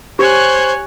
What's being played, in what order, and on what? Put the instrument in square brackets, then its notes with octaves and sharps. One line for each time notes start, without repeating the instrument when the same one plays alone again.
[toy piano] G4 [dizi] C5 [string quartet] C#5 G#5 F#6